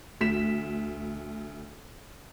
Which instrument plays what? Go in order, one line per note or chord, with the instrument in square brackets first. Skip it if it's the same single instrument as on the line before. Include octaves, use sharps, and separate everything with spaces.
[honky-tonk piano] D2 B6 E7